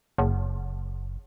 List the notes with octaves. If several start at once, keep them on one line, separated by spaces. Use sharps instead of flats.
F#1